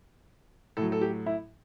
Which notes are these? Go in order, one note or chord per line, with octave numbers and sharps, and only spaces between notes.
A2 F#3 A4
A4
G4
E4